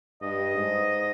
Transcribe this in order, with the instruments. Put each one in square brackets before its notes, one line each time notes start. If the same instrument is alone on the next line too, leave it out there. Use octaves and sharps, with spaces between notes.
[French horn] G2 [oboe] D#5
[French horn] G#2